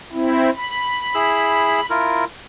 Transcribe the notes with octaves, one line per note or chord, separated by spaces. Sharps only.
C4 E4
B5
E4 G#4 E6
E4 F4 A#4